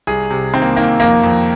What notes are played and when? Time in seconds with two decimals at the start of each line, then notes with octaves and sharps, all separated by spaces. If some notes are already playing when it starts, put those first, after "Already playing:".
0.07 C2 G#4
0.30 C3
0.53 D#3 C4
0.62 A#3
0.76 D#3 A#3
1.00 F2 A#3
1.23 F2